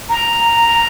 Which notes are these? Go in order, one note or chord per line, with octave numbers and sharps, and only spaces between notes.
A#5